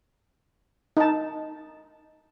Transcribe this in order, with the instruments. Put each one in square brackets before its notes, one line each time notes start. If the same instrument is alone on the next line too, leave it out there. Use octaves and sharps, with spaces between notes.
[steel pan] D#4 A5